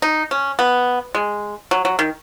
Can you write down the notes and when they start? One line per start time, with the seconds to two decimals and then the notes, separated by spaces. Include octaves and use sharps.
0.02 D#4
0.31 C#4
0.59 B3
1.15 G#3
1.71 F#3
1.85 F#3
1.99 D#3